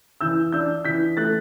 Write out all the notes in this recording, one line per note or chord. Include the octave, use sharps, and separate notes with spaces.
E3 E6 G6
D4 E6 G6
E3 G6 B6
A3 F#6 A6